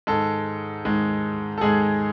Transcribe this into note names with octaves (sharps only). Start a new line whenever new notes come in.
G#2 D#3 G#3 A4
G#2 D#3 G#3
A4
G#2 D#3 G#3 G#4